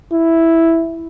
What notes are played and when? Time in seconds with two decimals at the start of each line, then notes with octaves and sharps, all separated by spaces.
0.12 E4